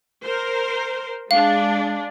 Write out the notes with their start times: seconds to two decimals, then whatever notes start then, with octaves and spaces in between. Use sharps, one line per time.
0.23 A#4 C5
1.31 G#3 D4 F5